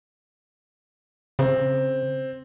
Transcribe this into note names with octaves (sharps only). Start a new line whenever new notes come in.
C#3 C4